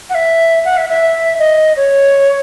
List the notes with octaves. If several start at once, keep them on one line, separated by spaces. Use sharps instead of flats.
F#5
E5
F#5
E5
E5
D#5
C#5